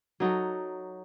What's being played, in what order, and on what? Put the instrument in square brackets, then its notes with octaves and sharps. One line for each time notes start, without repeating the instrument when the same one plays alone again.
[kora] F#3 D#4 F#4 A4